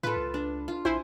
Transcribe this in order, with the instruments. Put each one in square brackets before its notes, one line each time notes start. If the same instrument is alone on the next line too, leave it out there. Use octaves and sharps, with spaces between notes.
[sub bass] A2 [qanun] F4 A4 [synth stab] B4
[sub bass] C#2
[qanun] D4
F4
[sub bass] A#1 [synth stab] E4 C5 [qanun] G#5